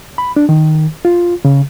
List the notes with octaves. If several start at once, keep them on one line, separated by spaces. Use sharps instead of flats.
B5
D4
D#3
F4
C#3